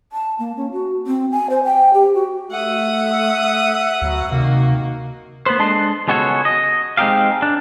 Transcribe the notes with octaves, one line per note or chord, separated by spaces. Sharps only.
A5
A#3
C#4
F#4
C4
G#5
C5
G5
G4
F#4
A3 E5 F#5 D#6
D2 F#3 B3
C3 D#3 A#3 F#4
A#3 B3 B4 C5
G#3 D4 A4 D#5 C6
C#2 G#3 B3 F#4 A4 C#5
D#5
G#3 C4 C#4 D#4 G4 F5
D4